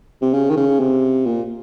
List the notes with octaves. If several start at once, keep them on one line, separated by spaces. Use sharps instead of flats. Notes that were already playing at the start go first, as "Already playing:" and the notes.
C3
C#3
D#3
C#3
C3
A#2